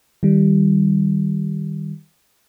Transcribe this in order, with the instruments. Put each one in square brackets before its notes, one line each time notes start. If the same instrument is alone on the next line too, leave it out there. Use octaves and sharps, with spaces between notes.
[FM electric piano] D#3 G3